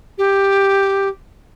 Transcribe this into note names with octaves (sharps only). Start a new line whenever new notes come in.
G4